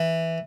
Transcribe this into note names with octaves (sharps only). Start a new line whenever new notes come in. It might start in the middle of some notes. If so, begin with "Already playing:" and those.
Already playing: E3